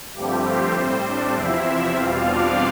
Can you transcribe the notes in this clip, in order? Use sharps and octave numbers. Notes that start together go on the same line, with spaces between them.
G2 D3 F3 G3 A3 C4 G4
C4 C5
A2 G3 C4
D4 D5
E2 C3 F3 C4 E4 E5
E2 B2 G3 C4 F4 F5
D4 D5